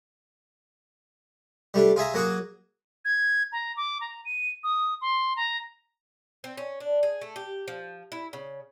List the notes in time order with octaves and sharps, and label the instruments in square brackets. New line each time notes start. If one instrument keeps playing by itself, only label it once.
[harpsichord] G3 A3 D4
F4 G#4 E5 A#5
F#3 A#3 F#4 G#4
[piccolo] G#6
A#5
D6
A#5
D#7
D#6
C6
A#5
[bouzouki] C4
C#4
D4
G#4
A3
G4
F3
E4
C#3